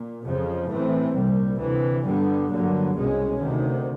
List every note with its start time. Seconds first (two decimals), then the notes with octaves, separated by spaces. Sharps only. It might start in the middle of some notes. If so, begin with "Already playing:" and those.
Already playing: A#2
0.26 F2 C#3 F3
0.70 A2 E3 A3 C4
1.15 C2 A#2 G3
1.60 D2 C3 E3
2.05 G2 D3 G3 B3
2.51 G2 D3 F#3 A#3
2.95 C2 B2 G#3 C#4
3.40 D2 C3 D#3